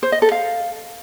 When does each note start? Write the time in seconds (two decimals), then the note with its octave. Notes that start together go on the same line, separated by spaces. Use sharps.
0.03 C5
0.12 D#5
0.22 A4
0.32 F5